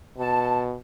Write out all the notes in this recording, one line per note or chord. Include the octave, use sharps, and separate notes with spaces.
B2 A5